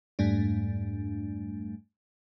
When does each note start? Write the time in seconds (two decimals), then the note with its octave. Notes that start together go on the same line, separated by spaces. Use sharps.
0.19 F2 G#2 G3 A3 D4